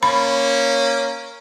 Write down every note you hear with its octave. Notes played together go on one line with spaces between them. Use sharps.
A#3 C#4 B5